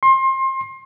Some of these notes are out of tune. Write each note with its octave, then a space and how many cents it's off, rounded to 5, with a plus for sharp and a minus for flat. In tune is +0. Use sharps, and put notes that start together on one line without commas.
C6 +30